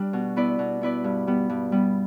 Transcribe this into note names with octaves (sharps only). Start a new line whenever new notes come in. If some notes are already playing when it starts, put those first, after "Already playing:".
Already playing: G3 D4
B2
B3 E4 B4 D5
B2
B3 E4 B4 D5
G2
G3 B3
G2
G3 B3